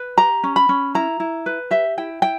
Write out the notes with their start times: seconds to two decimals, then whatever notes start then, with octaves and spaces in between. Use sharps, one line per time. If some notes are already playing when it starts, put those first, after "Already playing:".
Already playing: B4
0.17 G4 A#5
0.43 C#4
0.56 B5
0.69 C#4
0.95 E4 A#5
1.20 E4
1.46 B4
1.71 G4 E5
1.97 E4 G5
2.22 E4 G5